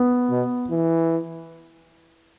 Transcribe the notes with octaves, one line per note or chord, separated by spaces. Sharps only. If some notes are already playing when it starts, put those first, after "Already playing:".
Already playing: B3
B2
E3